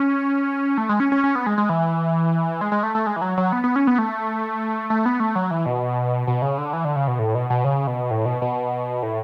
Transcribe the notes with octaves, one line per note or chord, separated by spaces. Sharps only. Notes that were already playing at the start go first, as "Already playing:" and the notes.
Already playing: C#4
A3
G#3
C#4
C#4
C#4
B3
G#3
G#3
E3
G#3
G#3
A3
A3
G#3
E3
F#3
F#3
B3
B3
C#4
B3
A3
A3
B3
A3
F#3
E3
B2
B2
C#3
D3
E3
D3
C#3
B2
A2
B2
B2
C#3
B2
A2
B2
B2
A2